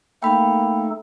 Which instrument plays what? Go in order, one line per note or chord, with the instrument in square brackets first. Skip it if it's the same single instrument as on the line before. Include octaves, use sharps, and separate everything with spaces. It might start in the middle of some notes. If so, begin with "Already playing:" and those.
[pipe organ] A3 D#4 A4 [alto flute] A#3 [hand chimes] G5 B5